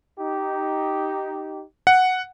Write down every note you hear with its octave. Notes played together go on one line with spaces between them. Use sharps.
D#4 G4
F#5